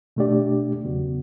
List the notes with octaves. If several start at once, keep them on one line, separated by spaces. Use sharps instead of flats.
B2 A3 D4 G4 D5
E2 C#3 F#3 B3 F#4